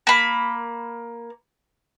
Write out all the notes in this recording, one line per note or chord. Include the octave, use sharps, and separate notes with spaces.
A#3 B5